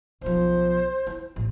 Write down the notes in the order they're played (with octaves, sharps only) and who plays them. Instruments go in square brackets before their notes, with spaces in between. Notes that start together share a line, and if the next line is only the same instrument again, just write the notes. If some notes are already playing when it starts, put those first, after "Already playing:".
[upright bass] B1 F3 [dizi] C5
[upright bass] E4
A1